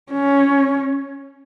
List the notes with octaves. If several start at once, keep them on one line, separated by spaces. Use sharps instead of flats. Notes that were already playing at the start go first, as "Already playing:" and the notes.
C#4